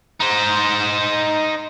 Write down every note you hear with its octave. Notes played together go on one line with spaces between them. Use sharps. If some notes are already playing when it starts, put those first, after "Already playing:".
D#4 C5